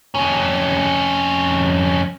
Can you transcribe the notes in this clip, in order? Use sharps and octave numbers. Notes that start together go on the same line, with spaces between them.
F2 C#4